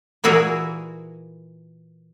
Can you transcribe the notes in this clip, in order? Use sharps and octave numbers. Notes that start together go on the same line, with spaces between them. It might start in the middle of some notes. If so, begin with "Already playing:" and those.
A#2 E3 E4 F#4 G#4 A#4